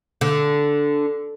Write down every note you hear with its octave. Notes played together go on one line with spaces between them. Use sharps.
D3